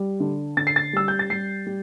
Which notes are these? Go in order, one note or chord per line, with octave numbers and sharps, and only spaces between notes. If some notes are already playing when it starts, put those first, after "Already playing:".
Already playing: G3
D3
D3 A6
C7
A6
G3 E6
G6
A6
G3 C7
G3